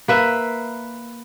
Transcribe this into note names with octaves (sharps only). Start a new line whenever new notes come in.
A#3 B4 E5